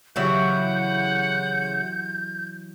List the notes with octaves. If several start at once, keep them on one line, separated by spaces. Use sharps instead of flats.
C#3 E3 F#3 E4 F#4 G4 F#5 G6